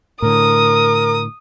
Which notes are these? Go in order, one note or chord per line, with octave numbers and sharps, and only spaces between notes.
A2 D3 A#4 D#6